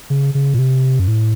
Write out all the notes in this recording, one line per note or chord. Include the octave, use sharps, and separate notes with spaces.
C#3
C#3
A#2
C3
F#2
A2